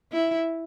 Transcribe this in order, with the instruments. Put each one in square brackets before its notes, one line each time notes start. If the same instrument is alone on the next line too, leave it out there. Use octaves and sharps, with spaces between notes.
[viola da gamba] E4